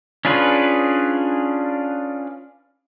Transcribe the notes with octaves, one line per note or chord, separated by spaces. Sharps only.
C#4 D4 F4 G#4 B4